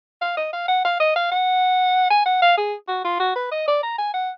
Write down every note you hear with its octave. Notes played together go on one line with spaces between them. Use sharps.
F5
D#5
F5
F#5
F5
D#5
F5
F#5
G#5
F#5
F5
G#4
F#4
F4
F#4
B4
D#5
D5
A#5
G#5
F#5